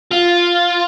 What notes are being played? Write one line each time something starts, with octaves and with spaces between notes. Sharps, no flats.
F4